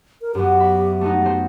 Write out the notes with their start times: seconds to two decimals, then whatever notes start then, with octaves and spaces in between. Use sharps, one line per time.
0.22 A#4
0.35 F#2 B3 G4
0.60 E5 B5
1.01 A3 B3 D#4
1.22 A3 C5